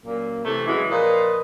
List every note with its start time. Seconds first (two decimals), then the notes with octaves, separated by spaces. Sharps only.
0.05 F#2 A#2 A#3
0.45 C3 E3 A3
0.67 C#3 E3 F#3 G#3
0.90 A#2 F3 B4 D#5